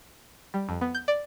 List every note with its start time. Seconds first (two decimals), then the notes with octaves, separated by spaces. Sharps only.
0.54 G3
0.69 F2
0.81 B3
0.94 G6
1.08 D5